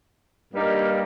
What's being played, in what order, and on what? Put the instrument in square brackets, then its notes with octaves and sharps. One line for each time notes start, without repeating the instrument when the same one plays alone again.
[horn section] G2 G3 A#3 D#4